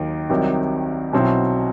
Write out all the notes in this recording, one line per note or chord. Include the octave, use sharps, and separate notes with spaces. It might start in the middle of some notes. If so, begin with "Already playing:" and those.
Already playing: D#2 D#3 F#3
C2 C3 D#3 F#3
B1 B2 F#3 C4 E4